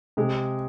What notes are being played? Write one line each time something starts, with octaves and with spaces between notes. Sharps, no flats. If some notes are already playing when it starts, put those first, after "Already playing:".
C3 G#3